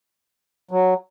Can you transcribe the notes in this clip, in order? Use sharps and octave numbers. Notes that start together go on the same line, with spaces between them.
F#3